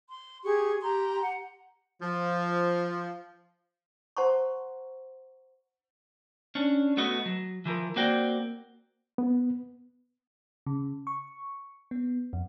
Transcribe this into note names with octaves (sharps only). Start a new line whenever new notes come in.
C6
G4 G#4 C#6 G#6
G4 A#5 C6
F#5
F3
C5 F#5 A5 A#5 C6 C#6
C#4 D4
A3 B3 F#4 D#5
F#3
E3 F3 A#4
A#3 C4 F#4 D5 G5
B3
C#3
C#6
B3
F2